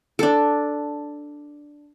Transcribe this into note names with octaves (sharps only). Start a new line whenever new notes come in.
D4 A4